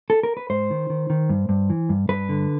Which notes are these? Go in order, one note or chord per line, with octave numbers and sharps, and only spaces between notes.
A4
A#4
B4
G#2 C5
D#3
D#3
D#3
G2
G2
E3
G2
G2 B4
D3